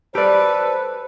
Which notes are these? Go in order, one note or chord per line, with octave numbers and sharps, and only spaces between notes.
G4 A4 B4 C5 D5